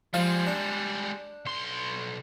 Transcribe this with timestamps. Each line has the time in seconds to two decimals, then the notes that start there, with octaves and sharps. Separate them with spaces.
0.14 F3 G3 G#3 F5
0.47 D4
1.46 B1 C6